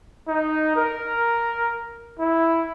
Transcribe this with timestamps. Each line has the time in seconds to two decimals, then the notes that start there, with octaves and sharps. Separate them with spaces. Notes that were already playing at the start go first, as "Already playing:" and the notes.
0.28 D#4
0.76 A#4
2.20 E4